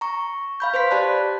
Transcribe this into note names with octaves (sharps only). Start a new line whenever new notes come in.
A#5 C#6
F5 B5 G6
B4 C5 C6 B6
G4 D5 A5 F#6